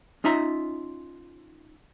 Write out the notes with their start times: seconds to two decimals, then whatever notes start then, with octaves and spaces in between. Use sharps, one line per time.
0.24 C#4 D#4 F4 E5 A#5